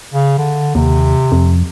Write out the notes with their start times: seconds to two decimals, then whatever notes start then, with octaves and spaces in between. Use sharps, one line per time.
0.14 C#3
0.38 D3
0.75 D#2 C3
1.32 F2